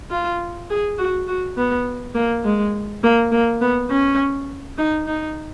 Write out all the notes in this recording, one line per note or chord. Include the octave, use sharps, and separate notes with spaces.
F4
G#4
F#4
F#4
B3
A#3
G#3
A#3
A#3
B3
C#4
D#4
D#4